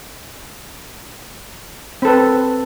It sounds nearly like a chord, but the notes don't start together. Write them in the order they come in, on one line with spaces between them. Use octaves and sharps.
C4 A4 B4